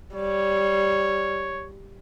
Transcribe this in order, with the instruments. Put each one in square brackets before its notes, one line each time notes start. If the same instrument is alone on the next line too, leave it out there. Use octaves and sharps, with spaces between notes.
[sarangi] G3 [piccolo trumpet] C#5